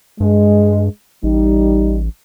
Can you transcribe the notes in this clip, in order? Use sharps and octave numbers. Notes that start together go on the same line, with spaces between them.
G2 G#3
A1 G3 D#4